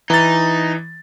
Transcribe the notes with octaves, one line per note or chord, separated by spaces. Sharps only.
E3 D#4 A6